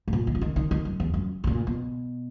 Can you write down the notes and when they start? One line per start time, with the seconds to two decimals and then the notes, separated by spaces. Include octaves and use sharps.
0.08 G#2
0.13 A#2
0.27 D#3
0.35 C#3
0.41 D#3
0.56 D#3
0.71 D#3
0.85 F#2
1.00 E2
1.14 F#2
1.44 G#2
1.47 A#2
1.67 B2